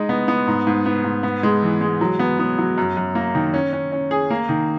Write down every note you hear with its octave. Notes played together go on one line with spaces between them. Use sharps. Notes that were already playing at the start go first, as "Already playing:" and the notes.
Already playing: G#3 D#4
B3
B3
G#2
G#2
B3
G#2
B3
G#3
E3
G#3
F#3
B3
B3
F#3
F#2
F#2
A#3
D#3
C#4
C#4
C#4
G#4
A#3
D#3